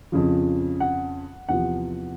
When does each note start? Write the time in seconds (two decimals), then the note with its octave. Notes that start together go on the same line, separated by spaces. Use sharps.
0.12 F2 C#3 F3
0.80 F#5
1.49 E2 C3 F3 F#5